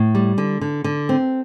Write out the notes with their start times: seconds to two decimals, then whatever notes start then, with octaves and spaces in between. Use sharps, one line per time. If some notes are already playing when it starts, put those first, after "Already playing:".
Already playing: A2
0.15 G3
0.38 D3
0.61 D3
0.84 D3
1.09 C4